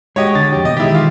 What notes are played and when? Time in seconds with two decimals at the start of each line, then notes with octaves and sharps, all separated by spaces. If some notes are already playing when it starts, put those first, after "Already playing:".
0.16 G#3 F#4 G4 C#5 D#5
0.35 D3 A6
0.53 F2 G4
0.65 B2 D#5
0.77 D#3 E3 G#3 E4 G4
0.95 F4